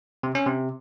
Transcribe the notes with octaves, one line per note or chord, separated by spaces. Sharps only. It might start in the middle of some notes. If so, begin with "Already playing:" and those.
C3
C#4
C3